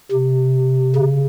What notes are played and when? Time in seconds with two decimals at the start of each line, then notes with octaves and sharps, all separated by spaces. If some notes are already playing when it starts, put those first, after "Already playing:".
0.12 C3
0.96 C#3